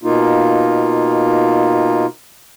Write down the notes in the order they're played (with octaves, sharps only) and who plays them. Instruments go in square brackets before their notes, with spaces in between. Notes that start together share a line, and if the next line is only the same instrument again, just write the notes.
[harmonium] B2 A#3 D#4 F4